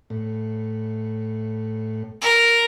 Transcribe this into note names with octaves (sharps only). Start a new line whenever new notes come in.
A2
A#4